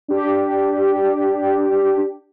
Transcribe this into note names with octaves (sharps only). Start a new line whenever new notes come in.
D4 G4